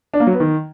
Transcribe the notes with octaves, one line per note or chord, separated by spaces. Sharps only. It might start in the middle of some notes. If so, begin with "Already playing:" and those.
D4
A#3
F#3
B3
D#3